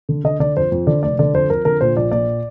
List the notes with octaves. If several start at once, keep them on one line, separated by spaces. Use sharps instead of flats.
D3
D3 D#5
D3 D5
F2 C5
F2
D3 D5
F1 D5
D3 D5
F2 C5
F2 A#4
D3 A#4
A#2 C5
A#1 D5
A#2 D5